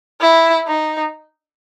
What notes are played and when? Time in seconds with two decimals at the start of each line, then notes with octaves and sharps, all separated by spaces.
0.21 E4
0.67 D#4